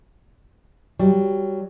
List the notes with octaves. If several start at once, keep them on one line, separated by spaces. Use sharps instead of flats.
F#3 G3